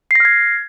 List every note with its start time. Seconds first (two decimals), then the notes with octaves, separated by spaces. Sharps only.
0.11 C7
0.15 A#6
0.20 F6
0.25 G#6